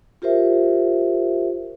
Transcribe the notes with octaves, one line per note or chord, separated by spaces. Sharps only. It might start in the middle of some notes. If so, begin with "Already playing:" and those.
F4 G4 A#4 C5 E5